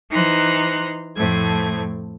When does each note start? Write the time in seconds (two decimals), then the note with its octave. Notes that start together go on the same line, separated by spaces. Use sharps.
0.10 E3 D#4 C5 A#5 C6 F#6
1.16 F2 A2 A3 C4 G#6